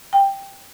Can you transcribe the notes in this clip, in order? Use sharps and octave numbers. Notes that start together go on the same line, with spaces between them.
G5